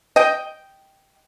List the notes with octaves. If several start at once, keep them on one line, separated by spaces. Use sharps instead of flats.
D#5 G5